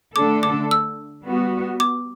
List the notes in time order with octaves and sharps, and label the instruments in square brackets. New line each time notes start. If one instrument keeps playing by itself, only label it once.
[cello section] D3 A3 D4 A4 [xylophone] D6
[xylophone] D6
E6
[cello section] G3 B3 F#4
[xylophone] D6